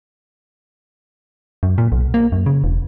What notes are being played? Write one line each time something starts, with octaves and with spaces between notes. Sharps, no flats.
F#2
A#2
B1
A#3
F#2
C#3
E1